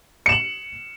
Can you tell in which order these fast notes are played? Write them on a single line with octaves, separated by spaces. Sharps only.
C#7 E7 F#7